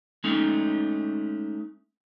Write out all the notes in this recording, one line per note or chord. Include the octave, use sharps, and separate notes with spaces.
G#3 A3 C#4 D#4